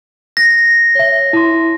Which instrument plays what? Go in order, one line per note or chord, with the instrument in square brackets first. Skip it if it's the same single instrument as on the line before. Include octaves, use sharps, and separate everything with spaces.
[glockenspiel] A#6
[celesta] C#5 E5
E4 C6